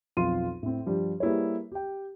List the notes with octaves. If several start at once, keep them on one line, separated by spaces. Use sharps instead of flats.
B1 F2 F4 C6 D#7
A2 C4
G2 F3 G3
G3 A#3 E4 G#4 B4 C#5
G4 G5